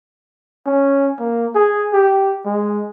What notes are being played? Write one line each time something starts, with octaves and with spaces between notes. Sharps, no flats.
C#4
A#3
G#4
G4
G#3